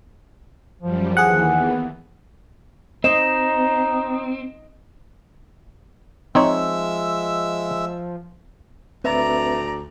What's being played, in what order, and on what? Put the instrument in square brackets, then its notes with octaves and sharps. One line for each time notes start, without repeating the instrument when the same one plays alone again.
[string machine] F#2 G3 [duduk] F3
[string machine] D#2 E3 [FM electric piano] G#4 F#5
[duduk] B3
[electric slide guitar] C4 [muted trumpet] D#4 [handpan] D#5 [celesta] E7
[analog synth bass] F3 [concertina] G#3 E5 E6 [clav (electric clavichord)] C4 D#4 C#5
[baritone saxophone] D2 [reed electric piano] C4 B4 E5 [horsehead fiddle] D5 A#5